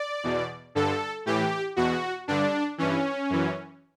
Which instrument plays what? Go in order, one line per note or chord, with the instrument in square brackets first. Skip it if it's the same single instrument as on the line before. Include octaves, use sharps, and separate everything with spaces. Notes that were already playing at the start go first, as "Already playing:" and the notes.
Already playing: [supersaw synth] D5
E2 B2
G2 D3 A4
A2 E3 G4
E2 B2 F#4
G2 D3 D4
G2 E3 C#4
F#2 E3